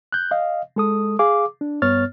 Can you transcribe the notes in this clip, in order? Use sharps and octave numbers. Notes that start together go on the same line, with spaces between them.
F#6 G6
D#5 F5
G#3 A4 D#6
G#4 F5 D6
D4
G2 B3 C#5 F6 A6